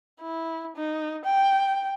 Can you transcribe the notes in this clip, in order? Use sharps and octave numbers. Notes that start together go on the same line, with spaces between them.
E4
D#4
G5